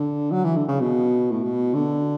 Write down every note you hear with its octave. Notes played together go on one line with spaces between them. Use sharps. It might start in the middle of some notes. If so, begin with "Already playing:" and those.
Already playing: D3
F#3
E3
D3
C#3
B2
A2
B2
D3